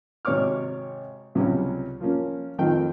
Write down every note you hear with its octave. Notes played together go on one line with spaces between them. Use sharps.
G#1 C3 C#5 C#6 D6 F6
C#2 C3 F#3 G3 C#4
F3 A#3 C#4
F2 D#3 F3 A3 C4 G5